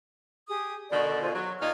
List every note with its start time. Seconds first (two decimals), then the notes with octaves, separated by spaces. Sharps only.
0.48 G4 G#4 D#6
0.90 B2 D3 D#3 A4 D5 C#6
1.21 F4 G#4 C5
1.33 F#3 C#6
1.60 D#2 A#2 D#4 F4 F6 G#6